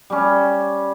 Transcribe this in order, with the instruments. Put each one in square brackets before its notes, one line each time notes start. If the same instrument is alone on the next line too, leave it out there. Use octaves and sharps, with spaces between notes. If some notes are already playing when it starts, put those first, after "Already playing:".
[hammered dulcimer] G3 C#4